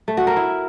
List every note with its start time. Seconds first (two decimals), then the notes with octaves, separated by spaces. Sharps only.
0.08 A3
0.17 F#4
0.27 A#4
0.37 E4